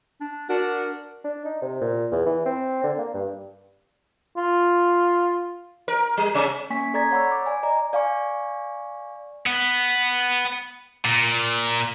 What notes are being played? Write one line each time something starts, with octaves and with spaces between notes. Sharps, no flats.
D4
D4 F#4 A#4
D4
D#4
C3
A#2
E2
E3
C4
D3
A#3
G2
F4
A#4
G3
C3 C#4 E5
A#3 C#4 G#5 C#6 B6
A4 D5 A#5 G#6 A6 B6
C#5 F#5 B5 C#6 E6
D6
D5 G#5
D5 D#5 A#5
D5 F5 G#5 C#6
B3
A#2